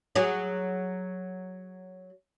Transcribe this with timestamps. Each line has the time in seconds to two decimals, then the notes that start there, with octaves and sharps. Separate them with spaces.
0.16 F#3 G#4